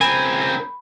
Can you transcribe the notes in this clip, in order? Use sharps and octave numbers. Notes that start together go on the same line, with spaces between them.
C#2 C4 A#4 G#5 B5